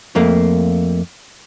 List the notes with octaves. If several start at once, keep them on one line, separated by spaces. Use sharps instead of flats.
F2 A3 A#3